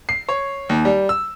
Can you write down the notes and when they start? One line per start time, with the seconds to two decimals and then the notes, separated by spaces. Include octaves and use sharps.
0.09 C7
0.29 C#5
0.69 D#2
0.85 G3
1.09 E6